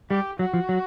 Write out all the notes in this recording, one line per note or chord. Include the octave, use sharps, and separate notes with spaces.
G3 G4
F#3 F#4
F3
F#3